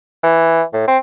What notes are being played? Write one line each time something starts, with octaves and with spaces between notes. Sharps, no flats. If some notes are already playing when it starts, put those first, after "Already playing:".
E3
A2
C4